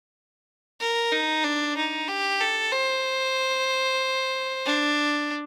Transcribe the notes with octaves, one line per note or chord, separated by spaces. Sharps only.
A#4
D#4
D4
D#4
G4
A4
C5
D4